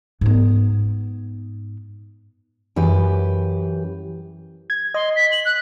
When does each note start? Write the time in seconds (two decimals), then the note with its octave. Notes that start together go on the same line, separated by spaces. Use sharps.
0.21 G#2 B3
2.76 F#2 E3 G4 B4
4.70 G#6
4.94 D#5 C6
5.15 B6
5.31 F#7
5.45 F#6